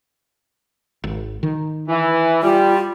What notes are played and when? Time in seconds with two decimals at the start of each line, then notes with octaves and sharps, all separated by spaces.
1.04 G#1
1.43 D#3
1.88 E3
2.43 G3 F4